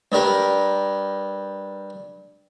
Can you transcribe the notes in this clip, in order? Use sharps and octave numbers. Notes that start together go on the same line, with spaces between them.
G2 G3 A#4